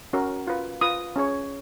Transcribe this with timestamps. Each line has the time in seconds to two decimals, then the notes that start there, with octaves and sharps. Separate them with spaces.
0.13 C#4 F#4 A#4
0.47 F4 B4
0.81 F4 B4 D#6
1.16 C#4 G#4 C#5